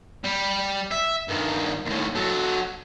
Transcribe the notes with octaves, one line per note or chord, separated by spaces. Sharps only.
G3
E5
G2 D#3
D#2 A2
F#3 A4